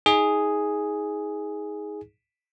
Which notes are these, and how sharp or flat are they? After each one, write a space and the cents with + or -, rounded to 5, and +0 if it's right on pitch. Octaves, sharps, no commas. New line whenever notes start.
D#4 +30 G#4 +0